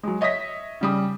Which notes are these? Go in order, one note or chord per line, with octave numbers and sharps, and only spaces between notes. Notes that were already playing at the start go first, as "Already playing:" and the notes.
F#3 G#3
C#5 D#5 E5 D#6 A#6 B6
C#3 G3 D#6